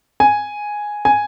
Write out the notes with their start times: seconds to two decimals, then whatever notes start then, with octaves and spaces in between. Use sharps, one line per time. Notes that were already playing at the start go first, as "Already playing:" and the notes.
0.20 G#5
1.05 G#5